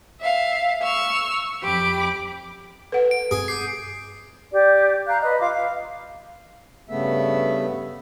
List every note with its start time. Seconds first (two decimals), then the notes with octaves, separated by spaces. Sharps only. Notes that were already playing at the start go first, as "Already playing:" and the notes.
0.22 E5 F5
0.83 C#6 E6 F6
1.63 F2 G4 B5 D6
2.92 A4 B4 F#5
3.11 D7
3.31 G2 C4 G#4 D#6
3.48 D6 G6 C7 D#7
4.52 G4 D5
5.08 F5 A#5 F#6
5.22 B4 D#5
5.40 F4 F5 D6
5.53 F5
6.89 G2 C#3 A3 B3 E5